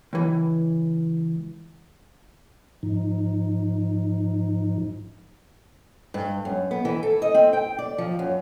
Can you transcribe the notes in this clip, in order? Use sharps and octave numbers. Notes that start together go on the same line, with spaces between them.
C#2 E3
G#2 F3 D#4
G2
F#2
B3
E3
A4
D#5
C4
G5
D5
F3
F#2